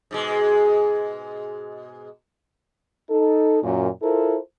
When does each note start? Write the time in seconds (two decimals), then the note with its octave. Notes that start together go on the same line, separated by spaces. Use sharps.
0.11 G#2 B2 G#3
3.10 D#4 A4
3.63 F#2 A#2
4.03 E4 F4 A4 A#4 C5